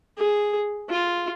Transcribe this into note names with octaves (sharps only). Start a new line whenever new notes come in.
G#4
F4